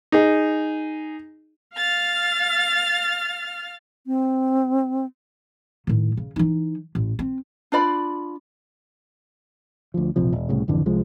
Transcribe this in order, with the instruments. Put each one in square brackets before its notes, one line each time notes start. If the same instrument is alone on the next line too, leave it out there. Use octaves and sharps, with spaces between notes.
[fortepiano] D#4 G#4
[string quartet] F5 F6 A6
[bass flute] C4
[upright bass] A2 D#3
C#3
E3 D#4
A1
C4
[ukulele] D4 F4 D5 B5
[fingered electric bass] D2 F3
E1 A#1 C3 F3
E1
C2 A2 C#3
G#1 F2 D3 E3
C2 F3 G#3